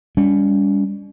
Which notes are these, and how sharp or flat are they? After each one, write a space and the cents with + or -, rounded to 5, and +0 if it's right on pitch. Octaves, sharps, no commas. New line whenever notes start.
G3 +35 C#4 +40